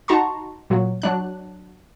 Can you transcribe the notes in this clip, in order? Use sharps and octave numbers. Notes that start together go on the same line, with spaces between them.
D#4 F#4 A5 A#5 C6 C#6
A#2 F#3
F#3 D4 F#6